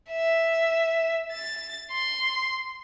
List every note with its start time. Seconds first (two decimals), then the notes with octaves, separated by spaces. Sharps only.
0.10 E5
1.31 A6
1.92 C6